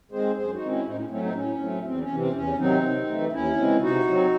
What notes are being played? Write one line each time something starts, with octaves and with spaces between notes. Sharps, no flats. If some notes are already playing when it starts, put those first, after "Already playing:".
D#3 G#3 C4 G#4 C5
F#2 G#4 C5
D#4 F#4
D#3 G#3 C4
C#4 E4
A2 C4 D#4
C#4
F#3 A3 C4 C#4
C4 D#4
A2 C#4
F#3 A3 C4
E2 C4
C#4
C3 E3
C4
E2 C#4
C3 D#3 F#3 C4 D#4
C3
E3 A3
D#2 C#4 E4
C#3 E3 G#3 C4
C3 D#4 F#4
F#3 C4